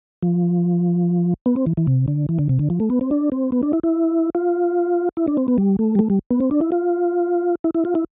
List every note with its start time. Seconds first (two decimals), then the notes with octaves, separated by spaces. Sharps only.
0.23 F3
1.46 B3
1.56 C4
1.66 E3
1.77 E3
1.87 C3
2.08 D3
2.29 E3
2.39 D3
2.49 C3
2.59 D3
2.70 F3
2.80 A3
2.90 B3
3.01 C4
3.11 D4
3.32 C4
3.52 B3
3.63 D4
3.73 E4
3.83 E4
4.35 F4
5.17 E4
5.28 D4
5.37 C4
5.48 B3
5.58 G3
5.79 A3
5.95 G3
5.99 A3
6.10 G3
6.31 B3
6.40 C4
6.51 D4
6.61 E4
6.72 F4
7.64 E4
7.74 E4
7.85 F4
7.95 E4